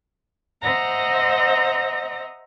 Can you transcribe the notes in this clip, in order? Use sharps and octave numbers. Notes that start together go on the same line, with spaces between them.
C5 D#5 E5 F#5 A#5